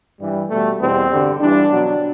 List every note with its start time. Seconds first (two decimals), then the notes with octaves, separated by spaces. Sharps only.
0.20 G2 E3 G3
0.50 B2 G3 A3
0.80 E2 B2 G3 C4
1.10 G2 D3 G3
1.40 G2 E3 G3 D4
1.70 B2 F#3